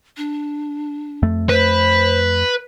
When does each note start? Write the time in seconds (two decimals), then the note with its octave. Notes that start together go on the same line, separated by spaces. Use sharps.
0.17 D4
1.23 F2 A3
1.49 B4 C5